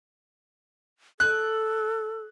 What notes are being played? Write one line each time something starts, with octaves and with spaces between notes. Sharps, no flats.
A4 F#6